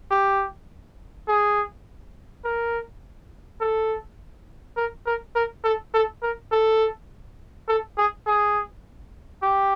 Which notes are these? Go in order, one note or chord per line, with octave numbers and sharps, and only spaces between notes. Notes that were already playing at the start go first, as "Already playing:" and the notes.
G4
G#4
A#4
A4
A#4
A#4
A#4
A4
A4
A#4
A4
A4
G#4
G#4
G4